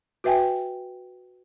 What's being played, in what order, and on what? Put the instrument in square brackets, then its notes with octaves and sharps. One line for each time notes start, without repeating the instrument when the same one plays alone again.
[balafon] F#4 B4 E5 G5 G#5